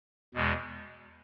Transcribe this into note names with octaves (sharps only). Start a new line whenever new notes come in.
E2 B2 G#3